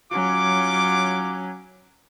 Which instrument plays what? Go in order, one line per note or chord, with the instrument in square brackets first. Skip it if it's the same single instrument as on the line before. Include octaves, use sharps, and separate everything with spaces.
[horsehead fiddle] F#3 C#4 [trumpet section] F4 D6